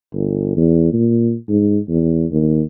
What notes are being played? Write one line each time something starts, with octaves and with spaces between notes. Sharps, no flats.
G1
E2
A#2
G#2
E2
D#2